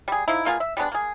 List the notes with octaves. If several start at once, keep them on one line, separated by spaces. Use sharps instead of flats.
G3 G#4
F3 D#4 E4
B2 A#3 F4 G#4
E5
G3 G#3 B3 D4
A#3 G#4